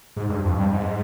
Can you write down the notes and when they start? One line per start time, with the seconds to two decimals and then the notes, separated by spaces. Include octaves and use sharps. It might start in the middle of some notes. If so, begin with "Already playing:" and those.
0.16 G#2
0.29 G2
0.44 F2
0.58 G2
0.72 G#2